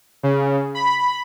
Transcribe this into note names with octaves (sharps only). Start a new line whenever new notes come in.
C#3
B5